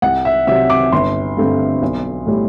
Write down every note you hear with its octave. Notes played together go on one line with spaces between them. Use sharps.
C2 F#5
E5
C3 F#3 C4 E5
D6
G1 C6
G2 D3 A3 C4
B1
A2 G3